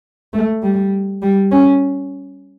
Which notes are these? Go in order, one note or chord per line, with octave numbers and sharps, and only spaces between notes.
A3
G3
G3
C#4